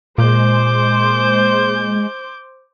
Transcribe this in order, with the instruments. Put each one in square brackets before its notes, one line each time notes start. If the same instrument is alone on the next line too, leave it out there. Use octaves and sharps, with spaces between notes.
[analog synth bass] A#2 [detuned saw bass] G#3 [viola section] C5 [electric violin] D6 G6